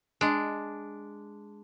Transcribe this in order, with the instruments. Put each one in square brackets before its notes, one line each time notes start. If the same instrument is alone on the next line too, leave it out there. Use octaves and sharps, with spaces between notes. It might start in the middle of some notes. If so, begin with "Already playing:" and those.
[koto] G#3 D4